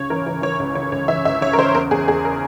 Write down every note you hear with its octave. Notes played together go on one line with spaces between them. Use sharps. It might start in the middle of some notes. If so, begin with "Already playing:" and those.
Already playing: C#2 C#3 C#5
E3 A#4
E3 C#5
E3 C#5
C#2 C#5
C#3 C#5
C#2 C#5
E3 E5
C#2 E5
C#3 C#5
A#4
C#3 C5
E2 A#4
E2 G#4
E2 G#4
A#4